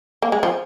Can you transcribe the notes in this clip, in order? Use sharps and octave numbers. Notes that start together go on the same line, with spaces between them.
A#3
G#3
F3